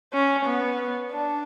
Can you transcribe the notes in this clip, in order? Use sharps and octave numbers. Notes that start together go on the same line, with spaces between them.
C#4
B3
D4